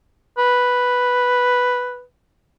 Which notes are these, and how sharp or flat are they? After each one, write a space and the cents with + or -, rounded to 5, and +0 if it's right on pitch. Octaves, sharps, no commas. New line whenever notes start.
B4 +0